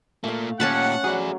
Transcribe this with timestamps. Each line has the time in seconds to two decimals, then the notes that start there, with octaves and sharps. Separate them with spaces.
0.24 A#2 A3 A#3 F5
0.60 A#2 C#4 G4 F#5 A5 B5
1.04 F#3 G#4 D5